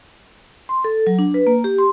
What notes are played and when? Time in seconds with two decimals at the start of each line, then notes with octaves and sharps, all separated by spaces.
0.69 C6
0.84 A4
1.07 F#3
1.19 D4
1.34 B4
1.47 A#3
1.64 G4
1.78 C6